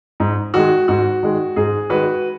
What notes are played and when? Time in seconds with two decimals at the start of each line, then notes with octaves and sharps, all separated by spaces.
0.20 G#2
0.54 D#3 G#3 F#4
0.88 G#2 F#4
1.23 D#3 G#3
1.56 G#2 G#4
1.90 D#3 G#3 F#4 B4